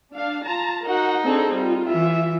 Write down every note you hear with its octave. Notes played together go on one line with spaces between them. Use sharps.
D4 F5
F4 A5 A#5
D#4 F#4 A#4 F#5
C4 D4 G#4 A4
G3 F4
E3 E5